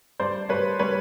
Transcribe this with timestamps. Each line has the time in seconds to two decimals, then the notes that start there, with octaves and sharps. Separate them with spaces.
0.20 G2 C5 D5
0.49 G2 B4 C#5
0.79 G3 B4 C#5